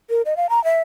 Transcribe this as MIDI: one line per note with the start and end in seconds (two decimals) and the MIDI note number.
0.10 0.22 70
0.25 0.37 75
0.37 0.47 77
0.49 0.62 82
0.64 0.81 76